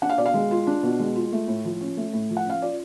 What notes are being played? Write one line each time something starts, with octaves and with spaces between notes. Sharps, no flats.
D4 F#5
F5
B2 D5
F5
G#3
F4
D4
B2
G#3
F4
A3
A2
F3
C#4
A3
A2
F3
F#5
C#4 F5
F4 D5